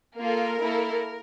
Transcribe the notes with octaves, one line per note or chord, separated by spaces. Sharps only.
A#3 F4 A4 A#4
A#3 E4 A4